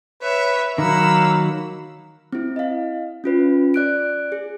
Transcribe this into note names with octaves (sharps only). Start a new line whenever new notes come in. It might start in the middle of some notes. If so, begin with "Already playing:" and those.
B4 C#5 E5
D#3 F#3 A#3 F#5 B5 E6
C4 E4
D#5 F5
C#4 F4 B4
D5 F#6 D7
G#4